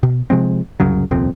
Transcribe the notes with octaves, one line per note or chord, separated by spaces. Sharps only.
B2
C3 F3 G#3 C4
C2 F#2 C#3 F#3
D#1 C2 F2 C4